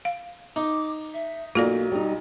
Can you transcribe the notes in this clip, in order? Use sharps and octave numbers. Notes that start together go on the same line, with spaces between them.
F5
D#4 D6
E5
B1 A#3 F4 F#4 A4 D5
G3 D#4